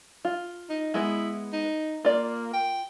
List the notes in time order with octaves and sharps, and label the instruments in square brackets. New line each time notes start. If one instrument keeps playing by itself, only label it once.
[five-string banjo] F4
[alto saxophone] D#4
[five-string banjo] G#3 B3 [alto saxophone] E4
[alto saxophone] D#4
[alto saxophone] A#3 [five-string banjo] F4 D5
[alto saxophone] G5